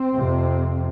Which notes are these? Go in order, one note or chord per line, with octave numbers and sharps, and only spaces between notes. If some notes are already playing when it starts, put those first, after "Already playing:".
Already playing: C4
F2 C3